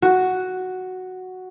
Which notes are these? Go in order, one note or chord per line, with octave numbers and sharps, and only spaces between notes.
F#4